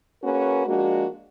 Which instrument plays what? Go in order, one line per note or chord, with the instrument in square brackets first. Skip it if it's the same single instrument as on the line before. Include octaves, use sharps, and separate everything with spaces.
[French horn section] A#3 C#4 F#4 G#4 A#4 B4
F3 G#3 A#3 D4 F#4